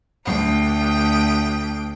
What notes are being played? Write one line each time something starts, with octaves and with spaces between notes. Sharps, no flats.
D2 G5